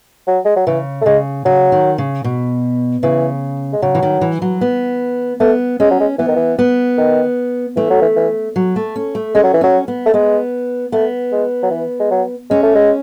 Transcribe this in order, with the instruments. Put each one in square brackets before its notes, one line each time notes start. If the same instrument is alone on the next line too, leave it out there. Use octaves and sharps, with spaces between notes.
[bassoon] F#3
G#3
F#3
[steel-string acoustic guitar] C#3 [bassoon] E3
[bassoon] A3
[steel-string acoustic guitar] C#3 [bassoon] G#3
[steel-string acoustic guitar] C#3 [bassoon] F#3
[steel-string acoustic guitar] D#3
C#3
B2
[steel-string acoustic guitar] C#3 [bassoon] E3
[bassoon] G#3
[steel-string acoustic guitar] C#3 [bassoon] F#3
[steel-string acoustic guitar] E3
D#3
E3
F#3
B3
[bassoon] A3 [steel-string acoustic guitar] B3
[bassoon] G#3 [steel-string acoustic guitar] C#4
[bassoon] F#3
G#3
[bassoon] E3 [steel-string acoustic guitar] B3
[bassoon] D#3
E3
[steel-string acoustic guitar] B3
[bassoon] D#3
[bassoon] E3 [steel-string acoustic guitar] A3
[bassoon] F#3
E3
E3
[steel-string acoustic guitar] F#3
A3
C#4
A3
[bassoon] G#3 [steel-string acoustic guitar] C#4
[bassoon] F#3
E3
[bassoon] F#3 [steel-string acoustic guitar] C#4
[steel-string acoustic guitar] B3
[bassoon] A3
[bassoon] G#3 [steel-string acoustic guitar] B3
[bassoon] A3 [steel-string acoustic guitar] B3
[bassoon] G#3
F#3
E3
G#3
F#3
[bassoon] G#3 [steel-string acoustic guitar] C#4
[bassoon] A3
G#3